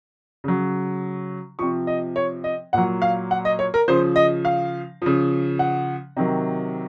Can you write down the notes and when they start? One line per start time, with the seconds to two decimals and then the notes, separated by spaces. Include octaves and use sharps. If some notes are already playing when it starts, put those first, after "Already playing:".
0.44 C#3 F#3
1.59 C3 F3 C#6
1.87 D#5
2.16 C#5
2.44 D#5
2.73 A#2 F#3 F#5
3.02 F5
3.31 F#5
3.45 D#5
3.59 C#5
3.74 A#4
3.88 C#3 F3 C5
4.16 D#5
4.45 F5
5.02 C#3 F3
5.59 F#5
6.17 C3 D#3 F#3